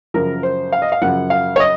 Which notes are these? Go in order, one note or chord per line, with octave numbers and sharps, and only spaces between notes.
F#2 C#3 F3 A#4
C5
F5
D#5
F5
F#2 C#3 F3 F#5
F5
C#5
D#5